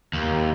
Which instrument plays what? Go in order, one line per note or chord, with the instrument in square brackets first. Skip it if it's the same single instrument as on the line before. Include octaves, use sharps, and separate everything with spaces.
[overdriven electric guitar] D#2